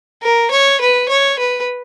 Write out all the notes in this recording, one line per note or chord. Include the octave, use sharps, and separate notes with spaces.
A#4
C#5
B4
C#5
B4